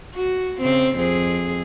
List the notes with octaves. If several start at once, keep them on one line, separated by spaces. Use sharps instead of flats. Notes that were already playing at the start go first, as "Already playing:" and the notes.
F#4
C#3 C4
F2 C4 G#4